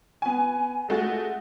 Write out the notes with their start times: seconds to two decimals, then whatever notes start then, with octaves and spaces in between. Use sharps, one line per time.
0.22 B3 G#5
0.89 G#3 A3 F#4 A6